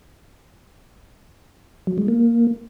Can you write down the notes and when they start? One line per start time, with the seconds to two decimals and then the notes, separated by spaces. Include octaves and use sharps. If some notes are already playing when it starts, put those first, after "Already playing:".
1.87 F#3
1.98 G#3
2.08 A#3